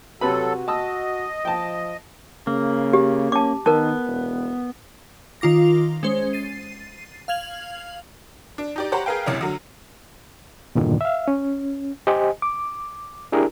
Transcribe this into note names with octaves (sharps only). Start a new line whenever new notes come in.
C3 F#3 F#4 A4 B4 B5
D#5 A5 D#6 E6
F3 G5 A5
C#3 A#3
G4
C#4 A5 D6
D#3 B3 A#4 A5
E1
D#3 F4 D6 A#6
G#3 C#4 C5
A6 C7 D#7
F5 F6 G#6 F7 F#7
D4
D#4 G4 D5
G4 C5 C#5 F#5 A#5 B5
G#4 A#4 B4 F5 G5
F#1 C#2 C3 C#4 E4 F6
D3 F#3
E2 G2 A#2 D3 D#3
E5 F5
C#4
G4 C5 D#5 G#5
D6
D4 E4 G4 G#4 A#4